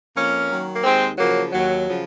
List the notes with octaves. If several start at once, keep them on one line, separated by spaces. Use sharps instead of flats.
F2 A#3 C#4
D#3 F#3
A#3
D#2 G#3 C4
C#3 F3 F#3 A#3
D#2 F#3
C#3 F3